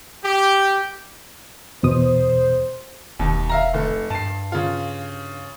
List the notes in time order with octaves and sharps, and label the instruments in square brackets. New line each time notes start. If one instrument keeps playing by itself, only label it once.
[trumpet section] G4
[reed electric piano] E2 B2 D#6 [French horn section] C5
[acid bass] E1 [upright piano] D#2
[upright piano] E5 F5 A#5
F1 A4
[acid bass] G2 [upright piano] A5 C7
[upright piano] C#3 F4